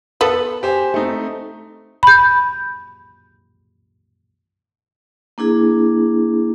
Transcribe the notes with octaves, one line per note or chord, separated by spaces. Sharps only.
B3 A4 B4 F#7
G4 C5 G#5
A3 C4 D#4
B5 G6
A#3 D4 E4 G#4